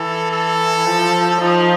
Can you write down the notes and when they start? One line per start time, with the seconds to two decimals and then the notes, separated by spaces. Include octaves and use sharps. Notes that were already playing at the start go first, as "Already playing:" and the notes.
Already playing: E3 A4
0.32 A4
0.87 F3
1.41 F3 D#4